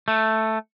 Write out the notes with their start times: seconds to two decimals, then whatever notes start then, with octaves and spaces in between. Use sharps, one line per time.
0.08 A3